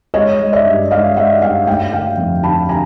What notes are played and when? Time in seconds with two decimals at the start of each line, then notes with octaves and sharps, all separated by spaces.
0.14 G#3 C#5 D#5
0.40 G#3
0.53 D5 E5
0.65 G2
0.91 G#3 D#5 F5
1.16 G#3 E5 F#5
1.42 G2 F5 G5
1.67 A3 F5 G5
1.93 D3 F5 G5
2.18 F2
2.43 D3 A5 B5
2.69 D3 G#5 A#5